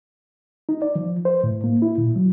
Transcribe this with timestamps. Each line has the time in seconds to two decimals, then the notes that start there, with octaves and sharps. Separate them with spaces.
0.69 D#4
0.82 D5
0.95 F3
1.25 C5
1.44 A2
1.64 A#3
1.82 E4
1.98 A#2
2.16 F#3